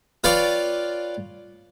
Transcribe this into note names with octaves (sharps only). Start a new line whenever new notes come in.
F4 B4 C#5 D5 F5 G5